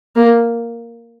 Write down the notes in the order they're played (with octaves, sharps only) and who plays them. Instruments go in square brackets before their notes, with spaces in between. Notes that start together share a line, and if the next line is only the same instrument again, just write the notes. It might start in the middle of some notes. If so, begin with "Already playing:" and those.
[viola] A#3